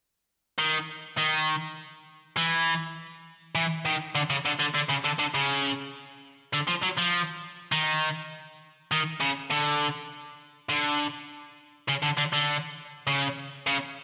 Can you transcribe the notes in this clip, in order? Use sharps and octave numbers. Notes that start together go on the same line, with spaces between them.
D#3
D#3
E3
E3
D#3
D3
C#3
D3
D3
D3
C#3
D3
D3
C#3
D3
F3
F#3
F3
D#3
D#3
C#3
D3
D3
C#3
D3
D3
D3
C#3
C#3